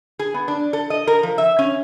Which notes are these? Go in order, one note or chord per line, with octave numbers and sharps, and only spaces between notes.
G#4
B3
D4
A4
D#5
A#4
F3
E5
C#4